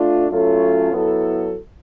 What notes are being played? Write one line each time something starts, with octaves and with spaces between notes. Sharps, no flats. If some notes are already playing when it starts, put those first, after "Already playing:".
Already playing: A3 D4 F4
F#3 A3 C#4 F4 A4
F#3 B3 E4 A4